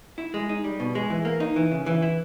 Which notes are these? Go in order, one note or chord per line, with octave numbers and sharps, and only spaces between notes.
E4
G#3
D#4
G3
B2
G#3
E3
A#3
D#4
E3
C#3
E3
E4